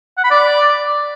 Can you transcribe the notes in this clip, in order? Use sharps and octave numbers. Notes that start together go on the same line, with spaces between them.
F#5
B5
D5